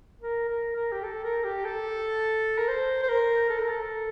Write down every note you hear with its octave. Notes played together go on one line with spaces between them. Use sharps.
A#4
A#4
A#4
G4
A4
A#4
G4
A4
A#4
C5
C5
A#4
A4
A#4
A4